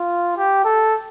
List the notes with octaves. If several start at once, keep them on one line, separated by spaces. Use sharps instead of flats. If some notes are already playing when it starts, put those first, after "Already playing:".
Already playing: F4
G4
A4